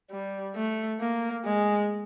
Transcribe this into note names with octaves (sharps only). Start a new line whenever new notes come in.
G3
A3
A#3
G#3